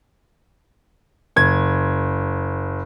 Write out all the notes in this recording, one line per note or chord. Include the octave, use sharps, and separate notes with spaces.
F#1 G#6